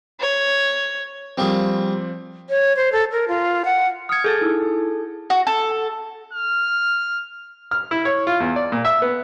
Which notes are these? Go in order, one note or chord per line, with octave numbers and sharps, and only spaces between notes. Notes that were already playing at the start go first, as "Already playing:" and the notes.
C#5
F3 G3 A#3 C4 G#4
C#5
C5
A4
A#4
F4
F#5
D#6 F6 G#6 C#7
G#4 A4 G6 A6
D#4 E4 E6
F#4
A4
F6
F6
E4
C#5
F4
E2
D5
A#2
E5
B3